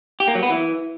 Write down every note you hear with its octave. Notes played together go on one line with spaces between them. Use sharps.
G4
A#3
F#3
B3
E3